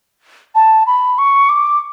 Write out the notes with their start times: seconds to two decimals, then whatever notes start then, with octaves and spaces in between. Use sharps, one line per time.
0.55 A5
0.87 B5
1.18 C#6
1.49 D6